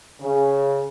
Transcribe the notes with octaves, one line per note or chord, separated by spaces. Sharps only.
C#3